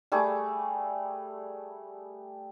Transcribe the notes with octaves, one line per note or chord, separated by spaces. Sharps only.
G3 A3 G#4 D6